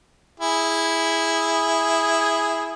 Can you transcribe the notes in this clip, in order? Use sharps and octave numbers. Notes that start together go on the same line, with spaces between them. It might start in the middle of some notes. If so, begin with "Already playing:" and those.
E4 G#4